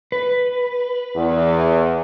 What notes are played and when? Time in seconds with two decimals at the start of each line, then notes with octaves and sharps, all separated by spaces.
0.12 B4
1.16 E2